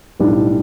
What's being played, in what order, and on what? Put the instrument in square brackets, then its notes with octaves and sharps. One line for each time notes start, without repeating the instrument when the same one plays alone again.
[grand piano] B1 A2 G3 D4